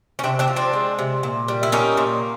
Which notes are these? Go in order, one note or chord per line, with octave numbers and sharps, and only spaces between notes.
C#4
C3 C4 D4
C4 D4
F3
C4 D4
G#3
C3
A#2
G3
E4
A#3 C#4 D#4
A#2